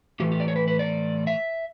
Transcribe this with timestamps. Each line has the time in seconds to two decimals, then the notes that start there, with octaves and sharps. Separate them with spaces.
0.20 A2 E3 A3 G4
0.32 G4
0.40 D5
0.48 C#5
0.56 B4
0.68 B4
0.79 D5
1.27 E5